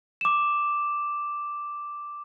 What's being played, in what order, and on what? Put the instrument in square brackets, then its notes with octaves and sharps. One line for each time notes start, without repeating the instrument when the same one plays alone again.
[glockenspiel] D6 E7